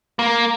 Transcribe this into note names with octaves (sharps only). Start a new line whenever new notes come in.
A#3